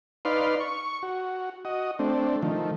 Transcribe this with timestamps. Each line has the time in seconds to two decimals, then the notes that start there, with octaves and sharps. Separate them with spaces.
0.25 D#4 B4 D5 F5 C6
0.60 C#6
1.02 F#4
1.65 F#4 D#5
1.99 A3 C4 D4
2.42 D#3 F3 A3